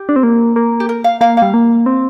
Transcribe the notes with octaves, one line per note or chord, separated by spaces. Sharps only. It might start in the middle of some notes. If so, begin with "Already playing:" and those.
Already playing: G4
D4
C4
A#3
A#3
G4
A#4
F5
A#3 F5
F5
G3
A#3
C4